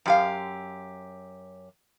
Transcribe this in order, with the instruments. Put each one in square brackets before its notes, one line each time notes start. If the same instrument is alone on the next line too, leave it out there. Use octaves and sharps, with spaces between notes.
[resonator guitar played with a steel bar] F#2 G4 F5